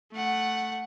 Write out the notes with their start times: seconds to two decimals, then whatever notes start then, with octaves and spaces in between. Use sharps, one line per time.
0.13 A3 F#5